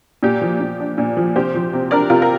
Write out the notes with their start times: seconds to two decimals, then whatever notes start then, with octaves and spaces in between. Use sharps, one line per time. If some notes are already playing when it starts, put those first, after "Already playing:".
0.23 A#2 G4
0.42 F3
0.60 A#2
0.80 D4
0.98 A#2
1.17 F3
1.36 C3 G4 C5
1.54 F3
1.73 C3
1.91 D4 A#4 D5
2.10 C3 F4 A#4
2.22 A#4